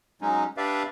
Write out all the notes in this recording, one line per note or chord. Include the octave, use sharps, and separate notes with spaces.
F#3 G#3 C#4 D#4
D4 G4 B4 D5 E5 F5